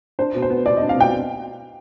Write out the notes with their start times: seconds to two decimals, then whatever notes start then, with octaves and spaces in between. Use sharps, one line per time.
0.19 D4 C5
0.35 B2
0.42 C5
0.50 B3
0.65 B2 D5
0.77 D4 D#5
0.89 F5
0.96 B2 G5